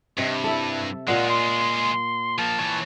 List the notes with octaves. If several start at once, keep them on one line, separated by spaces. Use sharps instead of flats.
G2 C3 D#5
E4 A4 E5
A#2 G#3 F4 D#5 F#5
C6
F3 A#3 A5
E3 C#5